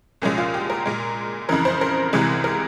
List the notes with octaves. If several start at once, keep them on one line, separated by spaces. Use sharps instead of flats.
C2 A#2 F3 G#3 C#4
F4
G4
A#4
A#2 G#3
F2 C#3 E3 A#4
C5
A#4
C2 C3 E3 G#3
A#4